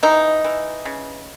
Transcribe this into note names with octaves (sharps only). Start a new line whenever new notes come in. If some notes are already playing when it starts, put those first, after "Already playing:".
E3 D#4
E3
C#3